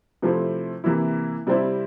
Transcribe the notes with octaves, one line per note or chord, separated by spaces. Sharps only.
C3 F3 A3 C4 E4
C3 E3 A#3 E4
C3 G3 C4 E4